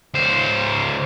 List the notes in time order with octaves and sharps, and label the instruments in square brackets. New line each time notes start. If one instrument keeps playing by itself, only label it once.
[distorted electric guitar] C#2 C5